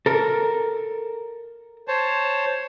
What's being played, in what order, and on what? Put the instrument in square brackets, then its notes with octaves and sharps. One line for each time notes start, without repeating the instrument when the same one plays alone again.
[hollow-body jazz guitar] A4 A#4
[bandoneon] C5 C#5 A5